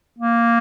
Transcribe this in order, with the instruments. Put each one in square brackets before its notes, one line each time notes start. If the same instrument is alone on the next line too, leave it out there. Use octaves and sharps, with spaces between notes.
[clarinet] A#3